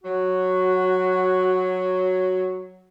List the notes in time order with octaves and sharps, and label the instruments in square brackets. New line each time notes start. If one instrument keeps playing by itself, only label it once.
[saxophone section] F#3 [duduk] F#4